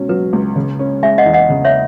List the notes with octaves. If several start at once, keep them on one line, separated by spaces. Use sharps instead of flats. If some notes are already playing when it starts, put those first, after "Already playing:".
Already playing: C#2 B2 C#4
F#3 B4
C#2
C#3
C#4
G#3 E5 G#5
D#5 F#5
E2
D#5 F#5
C#3
C#5 E5